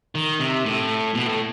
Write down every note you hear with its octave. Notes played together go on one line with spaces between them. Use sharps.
D#3
C3
A2
B2
A2